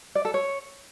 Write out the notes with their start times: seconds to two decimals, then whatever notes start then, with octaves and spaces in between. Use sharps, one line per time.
0.15 D5
0.25 A4
0.34 C#5